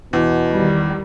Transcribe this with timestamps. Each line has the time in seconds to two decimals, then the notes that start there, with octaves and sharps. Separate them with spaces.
0.13 E2 B2
0.51 D#3 G3